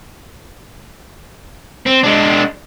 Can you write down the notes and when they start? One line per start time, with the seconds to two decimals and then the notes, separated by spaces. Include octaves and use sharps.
1.86 C4
2.03 G#3 D4